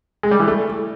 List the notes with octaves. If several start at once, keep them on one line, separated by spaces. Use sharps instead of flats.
G#3
G3
E3
A3